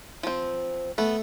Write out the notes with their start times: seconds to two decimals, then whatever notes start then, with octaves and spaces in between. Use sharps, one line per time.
0.23 F3 C4
0.98 A3 B3